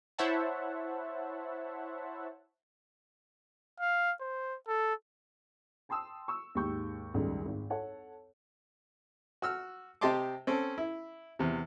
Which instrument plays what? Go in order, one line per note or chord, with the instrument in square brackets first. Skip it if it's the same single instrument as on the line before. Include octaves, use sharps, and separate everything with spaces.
[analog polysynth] E4 C5 C#5 E5 F#5 A5
[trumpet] F5
C5
A4
[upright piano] G5 A5 C6 D#6 E6
C#6 E6
D#2 G#2 G4 C#6 G6
C#2 F#2 D#3 G3 A3
G#1
A4 C#5 F#5 A5
[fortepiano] F#4 E6 F6
C3 G4 D#5 A5 C6 D6
C4 C#4 A4
E4
E2 C3